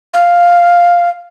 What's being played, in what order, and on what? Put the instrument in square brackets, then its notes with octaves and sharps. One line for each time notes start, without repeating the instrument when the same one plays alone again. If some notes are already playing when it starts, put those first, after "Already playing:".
[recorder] F5